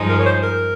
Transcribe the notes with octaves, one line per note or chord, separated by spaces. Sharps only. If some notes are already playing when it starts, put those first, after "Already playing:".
Already playing: G2 F3 G#3 D#4
A#4
C#5
C5
A#4